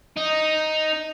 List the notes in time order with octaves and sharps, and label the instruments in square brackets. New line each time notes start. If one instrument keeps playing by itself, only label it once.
[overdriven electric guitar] D#4